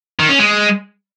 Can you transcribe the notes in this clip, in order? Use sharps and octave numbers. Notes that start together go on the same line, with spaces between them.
D#3
C#4
G#3